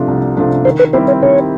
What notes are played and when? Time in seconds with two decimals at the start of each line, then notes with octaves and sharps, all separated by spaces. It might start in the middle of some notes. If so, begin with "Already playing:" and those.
Already playing: C3 F3 A3 D4
0.08 C2
0.37 C3 F3 A3 D4
0.65 D#3 C5
0.79 B4
0.93 G3 C4 E4 G4 C5
1.08 C#5
1.23 D#3 C#5